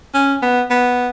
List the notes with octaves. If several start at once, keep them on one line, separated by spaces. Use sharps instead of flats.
C#4
B3
B3